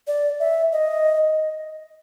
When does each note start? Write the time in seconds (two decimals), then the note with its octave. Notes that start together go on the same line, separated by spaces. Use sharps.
0.07 D5
0.40 E5
0.72 D#5